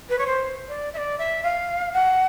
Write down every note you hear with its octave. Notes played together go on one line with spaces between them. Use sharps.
B4
C#5
C5
D5
E5
D5
E5
F5
F#5